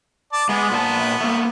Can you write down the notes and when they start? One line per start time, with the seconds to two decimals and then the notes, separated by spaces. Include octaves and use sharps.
0.33 D5 A5
0.49 G#3 B3
0.72 A#2 C5 A5
1.21 A3 A#3